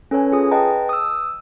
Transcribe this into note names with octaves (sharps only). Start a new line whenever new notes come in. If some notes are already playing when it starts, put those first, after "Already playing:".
C#4 A4 B4 C#5 G#5
F4 G#4 G#5 D#6
B4 D#5 G5 A5 A#5
D#6 E6